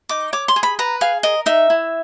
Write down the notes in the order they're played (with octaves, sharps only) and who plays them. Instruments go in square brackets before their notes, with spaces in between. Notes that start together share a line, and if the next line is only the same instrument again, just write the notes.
[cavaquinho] D#4 D6
C#5 D6
C6
G#4
B5
B4 A#5
G#4 F5
A#4 D#5
D#4 E5
E4